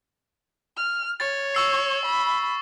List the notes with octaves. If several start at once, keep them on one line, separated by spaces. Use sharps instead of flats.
F6
C#5 A6
C#6 E6 C7
B5